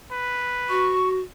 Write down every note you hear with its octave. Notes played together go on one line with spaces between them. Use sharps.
B4
F#4 C#6